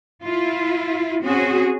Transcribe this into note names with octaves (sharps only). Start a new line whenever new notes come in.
E4 F4
C4 C#4 F#4 G#4